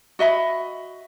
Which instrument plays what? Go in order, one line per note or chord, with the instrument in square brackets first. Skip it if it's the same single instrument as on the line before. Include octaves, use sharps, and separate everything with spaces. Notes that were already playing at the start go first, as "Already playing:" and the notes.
[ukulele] F#4 D#5 E5 B5